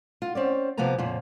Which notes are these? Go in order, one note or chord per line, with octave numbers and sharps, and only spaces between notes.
F4
C4 C#4 D5
C3 F3 A#3 B3 G#5 A#5
F2 A#2 C#3 F3